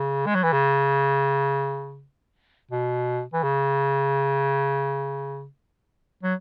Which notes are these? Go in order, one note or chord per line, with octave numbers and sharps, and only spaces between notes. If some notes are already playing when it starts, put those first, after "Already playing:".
Already playing: C#3
G#3
F#3
E3
C#3
B2
E3
C#3
F#3